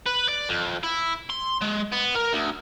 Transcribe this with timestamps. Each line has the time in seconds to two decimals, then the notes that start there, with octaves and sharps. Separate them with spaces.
0.07 B4
0.29 D5
0.49 F2
0.84 E4
1.30 C6
1.62 G#3
1.93 B3
2.16 A#4
2.33 D2